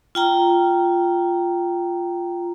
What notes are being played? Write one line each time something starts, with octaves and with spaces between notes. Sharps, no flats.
F4 G5 A#5